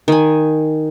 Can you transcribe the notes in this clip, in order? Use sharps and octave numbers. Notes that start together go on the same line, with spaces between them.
D#3 G#5